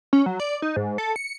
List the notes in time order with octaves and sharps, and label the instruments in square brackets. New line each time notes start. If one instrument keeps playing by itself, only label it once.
[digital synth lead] C#4
F#3
D5
D#4
G#2
A4
C#7